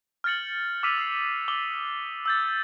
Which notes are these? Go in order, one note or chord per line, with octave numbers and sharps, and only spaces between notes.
F6 G6 A6 C#7 F#7
D6 E6 F6 B6 D#7 F7
D#6 C7
D6 D#6 F#7 G7
E6 G6 A6